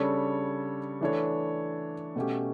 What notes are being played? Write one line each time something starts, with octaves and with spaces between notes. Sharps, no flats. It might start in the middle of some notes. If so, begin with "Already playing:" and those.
Already playing: C#3 G3 D4 A4 C#5
E3 A3 D4 A4 C#5
B2 A3 C#4 G4